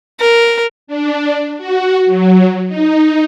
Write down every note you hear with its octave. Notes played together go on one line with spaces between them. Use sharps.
A#4
D4
F#4
F#3
D#4